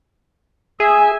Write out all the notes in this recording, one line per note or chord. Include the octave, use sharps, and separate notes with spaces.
G#4 E5 G#5